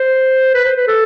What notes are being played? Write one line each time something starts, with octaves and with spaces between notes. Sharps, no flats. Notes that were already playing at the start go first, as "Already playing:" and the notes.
Already playing: C5
B4
C5
B4
A4